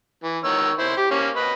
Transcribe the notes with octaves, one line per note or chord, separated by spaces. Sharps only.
E3
D#3 C#5 E6
E4 C5
G4
A#3 C#4
B4 D#5